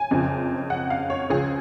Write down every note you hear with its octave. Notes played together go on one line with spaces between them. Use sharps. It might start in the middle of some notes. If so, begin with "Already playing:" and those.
Already playing: G#5
F#1 F2 C#3 F3
F#5
F5
C#5
C#2 C#3 F3 G#4